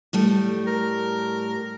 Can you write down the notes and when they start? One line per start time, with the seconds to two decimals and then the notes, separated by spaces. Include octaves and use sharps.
0.13 A2 G3 A3
0.67 A#4